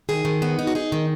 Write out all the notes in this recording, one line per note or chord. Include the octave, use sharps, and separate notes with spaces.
D#3 G#4
D#3
B3
D#4
F#4
D#4 G#4
D#3